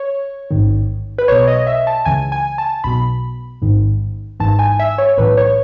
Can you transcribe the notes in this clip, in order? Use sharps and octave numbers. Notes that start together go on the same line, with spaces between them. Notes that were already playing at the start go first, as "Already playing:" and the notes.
Already playing: C#5
A1 G#2 D#3
B4
B1 B2 C#5
D#5
E5
A5
C#2 C#3 E3 G#5
G#5
A5
B1 B2 B5
A1 G#2 D#3
G#1 G#2 E3 A5
G#5
E5
C#5
C#5
B1 A2 E3 B4
C#5